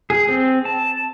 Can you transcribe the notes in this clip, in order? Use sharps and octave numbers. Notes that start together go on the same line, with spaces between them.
G#4
C4
A5